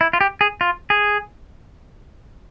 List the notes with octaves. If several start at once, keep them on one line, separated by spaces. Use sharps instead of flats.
E4
F4
G4
G#4
F4
G#4